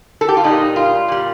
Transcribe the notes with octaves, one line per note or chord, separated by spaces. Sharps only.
A4
G4
F4
A#2 G3 D#4
F4
A#2 G3